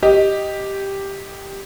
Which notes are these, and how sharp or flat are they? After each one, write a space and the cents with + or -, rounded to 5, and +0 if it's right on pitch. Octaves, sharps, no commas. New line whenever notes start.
G4 +0 D#5 +0